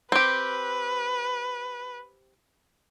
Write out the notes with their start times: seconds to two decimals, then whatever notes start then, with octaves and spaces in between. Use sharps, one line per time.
0.12 C4 G4 B4